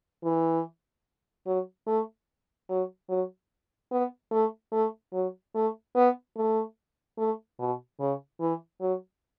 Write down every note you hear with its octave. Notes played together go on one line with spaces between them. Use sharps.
E3
F#3
A3
F#3
F#3
B3
A3
A3
F#3
A3
B3
A3
A3
B2
C#3
E3
F#3